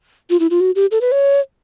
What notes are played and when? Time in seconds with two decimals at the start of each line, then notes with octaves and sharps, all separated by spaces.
0.30 F4
0.40 E4
0.51 F4
0.61 F#4
0.76 G4
0.91 A4
1.01 B4
1.12 C#5